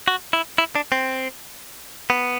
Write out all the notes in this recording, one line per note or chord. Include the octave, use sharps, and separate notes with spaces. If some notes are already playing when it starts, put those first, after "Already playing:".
F#4
E4
E4
D4
C4
B3